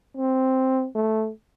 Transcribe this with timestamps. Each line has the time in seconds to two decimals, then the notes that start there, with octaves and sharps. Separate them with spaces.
0.17 C4
0.95 A3